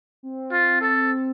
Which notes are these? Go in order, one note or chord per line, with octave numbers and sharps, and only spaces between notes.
C4
F4
A4